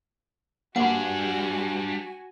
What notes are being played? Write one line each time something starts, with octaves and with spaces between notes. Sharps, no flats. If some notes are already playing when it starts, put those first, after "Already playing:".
G3 A#3 D4 F#4 F#5 G#5 B5